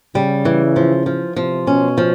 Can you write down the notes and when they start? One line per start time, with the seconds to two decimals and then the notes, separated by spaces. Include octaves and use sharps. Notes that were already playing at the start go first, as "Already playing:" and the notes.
0.15 C#3 G3
0.45 E3
0.76 F3
1.06 F3
1.36 C3 F3
1.67 B2 C#4
1.98 F3